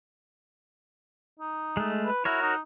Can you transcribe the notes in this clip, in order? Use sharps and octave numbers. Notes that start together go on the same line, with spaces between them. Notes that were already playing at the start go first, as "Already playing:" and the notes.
D#4
G#3 A3
B4
E4 F#4 A#4 C#5
D#4